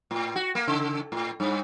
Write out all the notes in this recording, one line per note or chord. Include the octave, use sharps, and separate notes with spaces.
A2
F#4
A#3
C#3
A2
G2